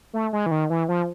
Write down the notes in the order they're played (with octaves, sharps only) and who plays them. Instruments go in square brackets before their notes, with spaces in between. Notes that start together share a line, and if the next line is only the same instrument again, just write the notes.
[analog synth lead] A3
G#3
E3
D#3
E3
F3